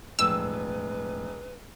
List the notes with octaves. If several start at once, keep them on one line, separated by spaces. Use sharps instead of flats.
E1 F2 A2 B4 E6